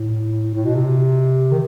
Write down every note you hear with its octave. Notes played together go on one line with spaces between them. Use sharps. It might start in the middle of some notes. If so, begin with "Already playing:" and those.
Already playing: A2
A2
B2
C3
D#3